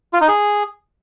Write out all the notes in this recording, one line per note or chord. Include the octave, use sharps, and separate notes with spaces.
F4
D#4
G#4